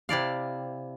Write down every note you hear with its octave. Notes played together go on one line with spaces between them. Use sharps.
C3 E4 D5 F5